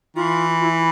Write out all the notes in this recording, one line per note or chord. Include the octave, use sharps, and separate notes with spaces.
E3 F4
F4
E4